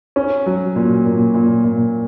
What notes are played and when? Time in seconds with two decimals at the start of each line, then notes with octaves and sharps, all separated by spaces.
0.16 C#4
0.46 F#3
0.76 A#2
1.06 A#2
1.34 A#2
1.64 A#2